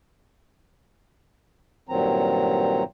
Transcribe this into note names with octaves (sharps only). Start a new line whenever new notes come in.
G2 A#2 D#3 F#3 C4 A#5